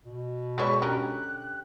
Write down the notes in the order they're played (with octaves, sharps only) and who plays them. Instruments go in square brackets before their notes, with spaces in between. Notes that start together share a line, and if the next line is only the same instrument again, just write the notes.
[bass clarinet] B2
[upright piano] G#3 C#5 D5 [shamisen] A3 B3 E4 [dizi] C#6
[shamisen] D3 C#4 A#4 [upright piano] G4 [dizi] F#6